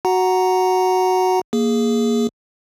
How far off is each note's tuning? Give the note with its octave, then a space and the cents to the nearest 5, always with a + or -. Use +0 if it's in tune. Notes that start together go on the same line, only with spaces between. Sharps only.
F#4 +0 F#5 +0 A#5 +0
A#3 +0 G#4 +0